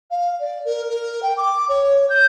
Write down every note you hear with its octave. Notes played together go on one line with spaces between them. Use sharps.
F5
D5
A#4
A#4
G5
D6
C#5
G6